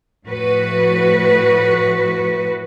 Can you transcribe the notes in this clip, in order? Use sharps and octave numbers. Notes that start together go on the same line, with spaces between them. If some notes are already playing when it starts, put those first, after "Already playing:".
A2 F3 F#4 B4